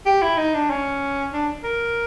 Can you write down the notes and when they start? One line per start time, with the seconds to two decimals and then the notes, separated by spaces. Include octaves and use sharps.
0.06 G4
0.22 E4
0.38 D#4
0.54 D4
0.70 C#4
1.33 D4
1.64 A#4